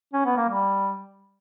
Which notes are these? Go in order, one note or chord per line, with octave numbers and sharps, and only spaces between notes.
C#4
B3
A#3
G3